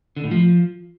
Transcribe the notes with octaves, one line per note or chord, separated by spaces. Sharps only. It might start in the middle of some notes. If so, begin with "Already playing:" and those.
D3
A2
F3